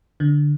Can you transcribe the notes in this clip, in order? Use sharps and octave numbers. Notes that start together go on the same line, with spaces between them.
D3